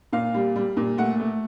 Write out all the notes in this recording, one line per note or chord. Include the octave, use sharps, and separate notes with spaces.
A#2 F5
G3
G3
A#2
A3 F#5
A3